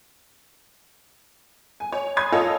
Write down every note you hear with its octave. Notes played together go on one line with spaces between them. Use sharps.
G#5
C#5
G#5 B5 C6 D#6 G#6
F4 A4 C#5 D#5